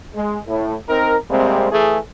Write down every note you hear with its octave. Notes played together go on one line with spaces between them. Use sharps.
G#3
A2
C4 D#4 A#4
C3 G3 G#3 A#3 C4
E3 A3 G#4